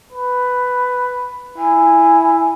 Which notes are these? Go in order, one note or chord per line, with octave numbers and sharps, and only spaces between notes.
B4
E4 G#5